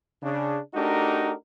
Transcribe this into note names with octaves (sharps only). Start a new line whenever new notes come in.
C#3 D4
A3 D4 D#4 F#4 G4 A#4